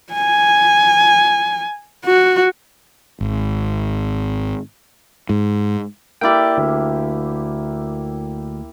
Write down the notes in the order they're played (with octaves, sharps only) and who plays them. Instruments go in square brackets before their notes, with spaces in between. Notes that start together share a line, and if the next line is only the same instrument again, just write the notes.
[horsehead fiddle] G#5
F#4
[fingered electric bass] G#1
G#2
[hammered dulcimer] A#3 E4 G4 [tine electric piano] D5 G5
[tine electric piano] D2